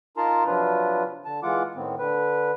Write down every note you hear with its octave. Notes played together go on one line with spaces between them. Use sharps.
D#4 F4 A#4 A5 A#5 C6
C3 F3 F#3 D4 F4 B4
D3 A5
E3 G#3 F4 F#5 D6
A2 D#3 B3 C4
D3 B4